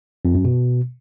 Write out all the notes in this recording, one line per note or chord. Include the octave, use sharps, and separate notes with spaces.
F2
F#2
B2